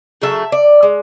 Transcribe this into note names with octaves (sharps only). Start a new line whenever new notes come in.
C#3 F#3 A3 E5
D5
G#3